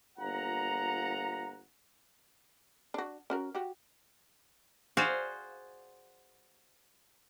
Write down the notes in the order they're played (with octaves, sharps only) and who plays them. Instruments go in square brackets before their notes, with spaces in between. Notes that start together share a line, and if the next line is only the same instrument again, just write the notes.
[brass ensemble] G1 A#2 F4 F#5 A#5
[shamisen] D4 F#4
C#4 F#4 A#4
F#4 G4
[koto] F#4 G#4 C5 D5 F5